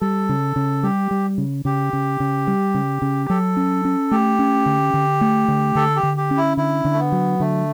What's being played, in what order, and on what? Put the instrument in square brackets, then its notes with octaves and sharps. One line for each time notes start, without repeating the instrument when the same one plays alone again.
[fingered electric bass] G3 [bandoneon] A4
[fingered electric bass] C#3
C#3
[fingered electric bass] G3 [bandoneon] G4
[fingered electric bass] G3
C#3
[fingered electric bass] C#3 [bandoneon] G4
[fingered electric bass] C#3
C#3
G3
C#3
C#3
[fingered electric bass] F#3 [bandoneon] A4
[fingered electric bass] C#4
C#4
[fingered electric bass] A3 [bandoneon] G4
[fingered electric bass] C#4
D3
D3
A3
D3
[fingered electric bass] D3 [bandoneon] A4
[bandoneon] G4
[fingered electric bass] D3
[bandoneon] G4
[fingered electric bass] C#4
[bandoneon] E4
[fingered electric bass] D3 [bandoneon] E4
[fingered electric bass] D3
[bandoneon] A3
B3
[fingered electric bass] F#3
[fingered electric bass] D3 [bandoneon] A3